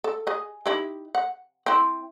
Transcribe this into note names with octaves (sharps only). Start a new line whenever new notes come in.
A4
G#4 D#5
D#4 E4 G4
F#5
C4 E4